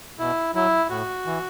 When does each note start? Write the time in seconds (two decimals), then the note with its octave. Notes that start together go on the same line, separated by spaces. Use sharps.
0.19 B2 E4
0.55 F#3 E4
0.90 A2 F#4
1.26 E3